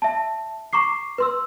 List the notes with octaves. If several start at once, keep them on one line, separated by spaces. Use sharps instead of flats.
E5 A5
A#5 C#6 D6 C7
B4 C6 E6